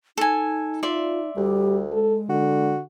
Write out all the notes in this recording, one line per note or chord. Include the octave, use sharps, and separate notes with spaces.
D#4 A4 G#5
F4 D5 E5 C6
D2 G3 G4
G#3 A4
D3 F#4